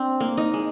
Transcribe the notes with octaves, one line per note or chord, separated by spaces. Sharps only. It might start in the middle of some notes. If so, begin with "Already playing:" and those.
Already playing: C4 D4
A#3
D#4
G#3